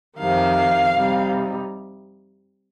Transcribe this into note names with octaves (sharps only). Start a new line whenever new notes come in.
F2 C3 D#3 F5
C3 G3 D#4